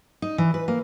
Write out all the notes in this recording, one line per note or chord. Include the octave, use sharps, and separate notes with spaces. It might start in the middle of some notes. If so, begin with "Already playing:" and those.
D#4
E3
B4
A#3